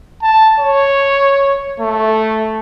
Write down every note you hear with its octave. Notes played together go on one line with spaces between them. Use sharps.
A5
C#5
A3